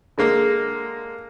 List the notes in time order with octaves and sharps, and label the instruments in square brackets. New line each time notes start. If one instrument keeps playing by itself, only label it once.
[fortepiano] D3 G#3 A#3